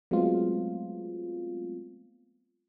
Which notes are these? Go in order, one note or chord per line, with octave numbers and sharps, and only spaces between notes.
F#3 G#3 A3 B3 C4 F4